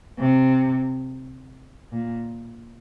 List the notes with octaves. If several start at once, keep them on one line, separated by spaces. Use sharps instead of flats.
C3
A#2